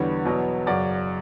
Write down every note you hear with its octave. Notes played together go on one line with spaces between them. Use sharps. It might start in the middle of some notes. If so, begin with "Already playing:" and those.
Already playing: E2 D3 G3 B3 C#5
E2 B2 F#3 B3
F#2 C#3 F#3 D5